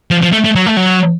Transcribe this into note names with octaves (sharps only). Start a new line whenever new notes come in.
F3
F3
A3
A3
F#3
A3
F#3